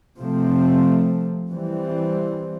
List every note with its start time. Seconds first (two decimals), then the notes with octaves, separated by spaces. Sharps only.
0.19 C3 F3 A3 C4
1.51 E3 G3 C4